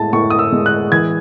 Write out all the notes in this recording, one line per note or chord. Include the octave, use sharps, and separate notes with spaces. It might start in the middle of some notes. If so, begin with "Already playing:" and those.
Already playing: A2 G#3 A5
A2 C#6
D#6
E6
G#3
F#6
E3 G#6